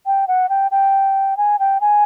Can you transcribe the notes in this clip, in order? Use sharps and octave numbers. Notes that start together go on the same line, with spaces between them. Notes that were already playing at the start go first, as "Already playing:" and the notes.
G5
F#5
G5
G5
G#5
G5
G#5